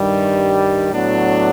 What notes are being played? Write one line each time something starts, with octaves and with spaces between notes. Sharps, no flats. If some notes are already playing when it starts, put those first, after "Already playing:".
Already playing: G2 D#3 G3
A2 F#3 B3 D4